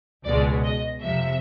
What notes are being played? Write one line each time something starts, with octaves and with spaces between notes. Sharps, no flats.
C#2 B2 G#3 D5
D#5
F2 C3 F3 E5